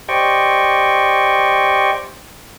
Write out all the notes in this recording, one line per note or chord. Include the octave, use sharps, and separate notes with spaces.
G4 C5 D5 D#5 G5 C#6